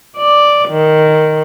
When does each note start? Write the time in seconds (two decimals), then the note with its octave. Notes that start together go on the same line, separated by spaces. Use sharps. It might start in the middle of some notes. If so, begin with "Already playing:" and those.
0.17 D5
0.69 D#3